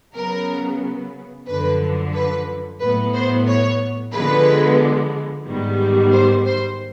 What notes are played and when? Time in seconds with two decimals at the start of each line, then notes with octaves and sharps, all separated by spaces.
0.14 C#3 F#3 B3 A#4
1.46 F#2 D3 F3 B4
2.13 B4
2.80 A2 F#3 B3 B4
3.14 C5
3.47 C#5
4.13 D3 F3 G#3 B3 B4
5.46 G#2 D#3 G3 B3
6.13 C5
6.46 C5